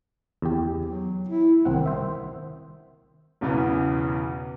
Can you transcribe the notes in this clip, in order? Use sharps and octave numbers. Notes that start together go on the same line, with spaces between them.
E2 G4
F#3
E4
C2 D#3 C4 F#5
C5 E5
B1 E2 C#3 E3 B3